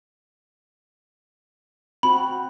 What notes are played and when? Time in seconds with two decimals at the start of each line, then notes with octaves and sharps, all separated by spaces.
2.03 C4 F#4 B5